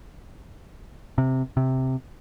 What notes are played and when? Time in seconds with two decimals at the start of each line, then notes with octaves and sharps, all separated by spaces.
1.18 C3
1.57 C3